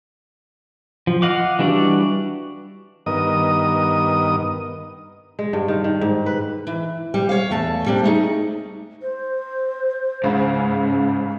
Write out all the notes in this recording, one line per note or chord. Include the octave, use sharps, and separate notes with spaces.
F3
D#5 F5 F#5 D6
E3 G3 D4 F#4 D5
G2 D#3 B3 A#4 D#5 D#6
G#3
G2
D#3
D#3
G#2
B4
E3
G3
C#5 F5
E2 A3 A5
G3 A#3 C4 D4
A3 D#4 G#4
C5
C#2 G#2 C#3